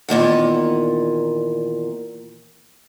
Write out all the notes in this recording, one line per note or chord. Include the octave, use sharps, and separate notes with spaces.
E2 A#2 D#3 F#5